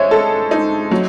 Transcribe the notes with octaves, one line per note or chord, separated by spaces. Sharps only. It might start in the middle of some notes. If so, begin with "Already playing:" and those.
Already playing: G#3 C5 C#5 D#5 E5
A4
D#4
F#3